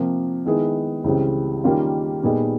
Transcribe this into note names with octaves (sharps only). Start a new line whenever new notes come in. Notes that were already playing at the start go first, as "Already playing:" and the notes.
Already playing: C3 F3 A#3
D#3 G#3 B3 E4 G#4
C#2 C#3 E3 G3 C4
D#3 G3 A#3 C#4 F4
A#2 G3 B3 D#4 G#4